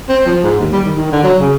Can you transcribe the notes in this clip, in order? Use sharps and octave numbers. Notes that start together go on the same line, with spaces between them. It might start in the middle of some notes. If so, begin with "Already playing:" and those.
C4
F3
G#2
D#2
G3
D#3
D#3
D3
F#3
C#3